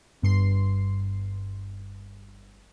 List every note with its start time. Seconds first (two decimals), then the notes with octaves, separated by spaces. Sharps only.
0.22 G1 G2 C6 C7